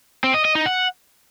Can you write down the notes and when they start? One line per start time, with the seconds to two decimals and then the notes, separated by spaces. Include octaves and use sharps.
0.24 C4
0.34 D#5
0.45 D#5
0.55 D#4
0.66 F#5